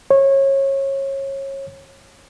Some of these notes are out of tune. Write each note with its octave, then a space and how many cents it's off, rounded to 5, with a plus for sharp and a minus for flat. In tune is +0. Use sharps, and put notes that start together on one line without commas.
C#5 -25